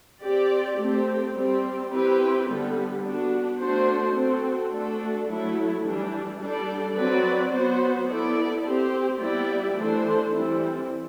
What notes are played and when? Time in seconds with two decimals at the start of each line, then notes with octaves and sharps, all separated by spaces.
0.23 C4 G4 D5
0.79 A3 C4 G4
1.35 G3 C4 G4
1.91 C4 E4 G4 B4
2.47 D3 G3 B3
3.03 B3 D4 F#4
3.59 A3 D4 F#4 C5
4.15 C4 F#4 A4
4.72 A3 D4 F#4 A4
5.28 F#3 A3 E4
5.84 E3 G3 D4
6.40 G3 D4 A4 D5
6.96 F#3 C4 F#4 B4 D5
7.52 F#3 B3 F#4 C5
8.08 B3 E4 A4 D5
8.64 C4 G4 C5
9.20 G3 B3 E4 G4 D5
9.76 E3 A3 D4 A4 C5
10.33 E3 G3 C4 E4